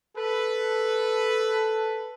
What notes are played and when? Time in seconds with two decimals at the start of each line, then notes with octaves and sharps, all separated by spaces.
0.17 A4 B4